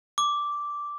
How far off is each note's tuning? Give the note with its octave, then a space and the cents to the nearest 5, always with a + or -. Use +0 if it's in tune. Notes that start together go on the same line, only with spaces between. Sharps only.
D6 -5